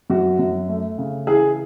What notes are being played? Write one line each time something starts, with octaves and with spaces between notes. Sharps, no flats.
F#2 F#4
F#2
A3
C#3
E3 G#4